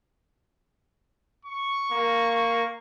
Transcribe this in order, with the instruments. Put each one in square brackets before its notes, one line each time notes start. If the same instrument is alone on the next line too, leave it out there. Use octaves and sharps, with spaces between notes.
[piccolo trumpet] C#6
[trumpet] A#3
[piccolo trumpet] C#6